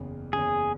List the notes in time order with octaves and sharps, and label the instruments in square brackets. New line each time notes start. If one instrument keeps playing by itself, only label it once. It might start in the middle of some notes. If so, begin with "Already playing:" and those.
Already playing: [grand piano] F#1 E2 C#3
[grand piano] F#1 E2 C#3 [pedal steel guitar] G#4